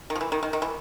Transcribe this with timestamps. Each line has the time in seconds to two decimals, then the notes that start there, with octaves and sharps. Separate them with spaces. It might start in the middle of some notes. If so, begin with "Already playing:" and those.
0.10 D#3
0.15 F3
0.21 E3
0.32 D#3
0.43 D#3
0.53 D#3
0.62 E3